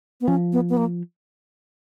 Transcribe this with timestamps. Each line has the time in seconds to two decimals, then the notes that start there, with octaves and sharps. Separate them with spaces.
0.21 B3
0.28 F3 C#4
0.53 B3
0.69 B3
0.77 A#3